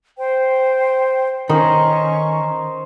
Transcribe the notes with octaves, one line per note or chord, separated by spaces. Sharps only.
C5 G5
D#3 C#4 A#4 C5 D#5 C#6